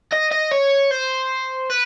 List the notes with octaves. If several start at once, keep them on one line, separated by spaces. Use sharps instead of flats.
D#5
D#5
C#5
C5
B4